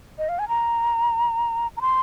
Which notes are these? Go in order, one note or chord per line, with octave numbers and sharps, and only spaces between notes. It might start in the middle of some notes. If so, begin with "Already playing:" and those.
D#5
F5
G#5
A#5
A#5
C6